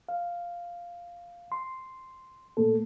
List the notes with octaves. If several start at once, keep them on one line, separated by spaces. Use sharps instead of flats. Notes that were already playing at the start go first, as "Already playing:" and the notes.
F5
C6
A#2 A3 A#3 A4